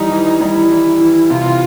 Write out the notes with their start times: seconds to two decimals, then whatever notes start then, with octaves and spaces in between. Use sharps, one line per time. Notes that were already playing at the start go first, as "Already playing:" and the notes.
Already playing: E3 G3 D#4
0.11 E3
0.41 G3 E4
0.71 E3
1.00 E3
1.30 C3 F4